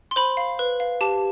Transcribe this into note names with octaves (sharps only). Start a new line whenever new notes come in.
C6
C5 B5
F5
B4
F5
G4 A5